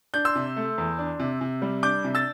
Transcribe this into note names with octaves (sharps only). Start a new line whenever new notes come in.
D4 G6
C6 E6
C3
A3
E2
D4
C3
C3
G3
D4 D6 G6
C3
E6 A6